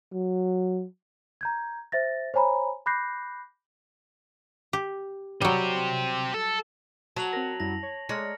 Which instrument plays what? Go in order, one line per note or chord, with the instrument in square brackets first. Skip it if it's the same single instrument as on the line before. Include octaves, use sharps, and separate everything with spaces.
[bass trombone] F#3
[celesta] A#5 G6 G#6
C5 E5 A6 A#6
C5 C#5 G#5 A#5 B5
B5 D6 F#6 G6 A#6 C7
[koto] G4
[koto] F#3 G3 [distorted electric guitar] G4 C5
[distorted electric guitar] A4
[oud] F#3 [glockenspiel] A5 F7 F#7
[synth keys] C4 A#4 [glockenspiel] A#6
[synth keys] F#2 G3 E4 [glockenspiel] A#6
[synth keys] C#5
[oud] G#3 [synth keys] C#5 D5 A#5 [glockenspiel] F6 A#6 C#7